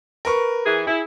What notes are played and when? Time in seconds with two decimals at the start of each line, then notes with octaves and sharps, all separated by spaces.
0.25 A#4 B4 C#6
0.66 E3 G#4
0.87 E4 G#4